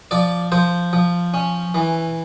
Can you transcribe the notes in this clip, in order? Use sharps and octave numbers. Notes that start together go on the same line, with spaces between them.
F3 D5
F3 C5
F3
C#4
E3